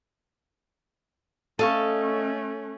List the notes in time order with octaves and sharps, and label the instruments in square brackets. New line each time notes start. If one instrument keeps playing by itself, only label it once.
[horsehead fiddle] A3 C#4 [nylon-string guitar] A4 [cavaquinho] D#5 F5 C#6